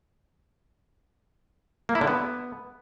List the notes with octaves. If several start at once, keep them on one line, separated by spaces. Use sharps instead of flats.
A#3
E4
D3
B3